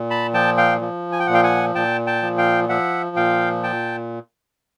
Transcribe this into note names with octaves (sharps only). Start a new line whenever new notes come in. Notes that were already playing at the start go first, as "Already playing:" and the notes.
Already playing: A#2
A5 B5
F3 G5 A5
F5 G5
F3
G#5
G5
A#2 F#5
F5 G5
F#5 G#5
A#2 G5 A5
G5 A5
F3
F5 G5
F3 E5 F#5
A#2 F5 G5
G5 A5